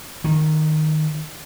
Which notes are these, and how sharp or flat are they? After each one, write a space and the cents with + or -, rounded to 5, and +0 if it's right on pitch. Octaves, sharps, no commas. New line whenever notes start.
D#3 -5